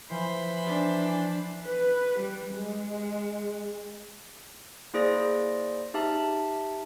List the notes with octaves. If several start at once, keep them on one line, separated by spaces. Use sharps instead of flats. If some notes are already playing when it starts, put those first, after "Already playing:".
E3 F3 E4 C5 B5
D4
B4
G3
G#3
A#3 E4 G#4 C5 D5 A#6
D#4 G4 E5 A5